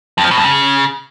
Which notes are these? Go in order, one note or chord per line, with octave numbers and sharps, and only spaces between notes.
F2
F3
B2
F2
C#3